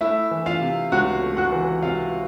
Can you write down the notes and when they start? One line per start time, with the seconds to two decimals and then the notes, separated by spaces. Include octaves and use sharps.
0.01 A3 E4 E5
0.31 E3
0.46 F4 F5
0.62 C3
0.92 C#2 F#4 F#5
1.22 A3
1.37 F#4 F#5
1.52 E3
1.82 C3 F4 F5